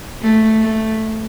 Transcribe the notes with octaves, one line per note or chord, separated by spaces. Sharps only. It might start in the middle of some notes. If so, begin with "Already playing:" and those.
A3
A3